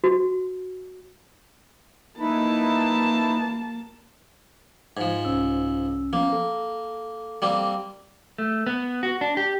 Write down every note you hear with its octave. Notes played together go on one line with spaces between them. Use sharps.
F#4
A#3 D#4 E4 B4 A5
G#2 F3 G#6
C2 C#4 E6
F3 A#3 B3 C#4
A4
G3 A#3 C4
A3
B3
F#4
D4
G4